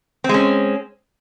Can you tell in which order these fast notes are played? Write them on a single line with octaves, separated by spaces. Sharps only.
C4 G#3 C#4